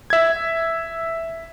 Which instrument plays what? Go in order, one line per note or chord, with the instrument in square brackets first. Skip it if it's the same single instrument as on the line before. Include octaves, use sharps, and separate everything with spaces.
[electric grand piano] E5 G#6